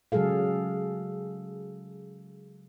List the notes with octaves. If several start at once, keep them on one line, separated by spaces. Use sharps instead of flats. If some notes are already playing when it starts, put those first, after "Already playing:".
C#3 F#3 G#3 G#4 A4 F5